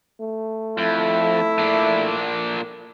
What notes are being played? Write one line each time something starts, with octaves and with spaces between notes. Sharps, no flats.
A3
F2 E4
A#2 D4